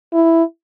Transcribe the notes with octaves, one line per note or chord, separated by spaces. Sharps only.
E4